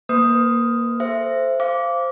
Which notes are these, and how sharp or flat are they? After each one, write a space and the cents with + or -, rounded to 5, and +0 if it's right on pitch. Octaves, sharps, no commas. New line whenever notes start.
A#3 +5 B4 +40 D#6 +0
A4 -10 C5 +0 E5 +25
C5 +0 F5 -20 D6 -15